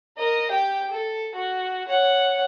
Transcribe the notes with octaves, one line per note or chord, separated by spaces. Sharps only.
A#4 D#5
G4 G5
A4
F#4
C#5 F#5